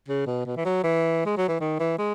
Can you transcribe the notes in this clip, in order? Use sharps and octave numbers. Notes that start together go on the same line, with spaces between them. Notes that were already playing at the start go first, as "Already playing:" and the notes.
C#3
B2
B2
E3
F#3
E3
G#3
F#3
E3
D#3
E3
G#3